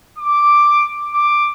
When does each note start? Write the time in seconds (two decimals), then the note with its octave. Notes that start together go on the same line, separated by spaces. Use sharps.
0.19 D6
1.14 D6